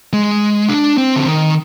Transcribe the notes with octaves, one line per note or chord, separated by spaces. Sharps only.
G#3
D4
C4
D3
D#3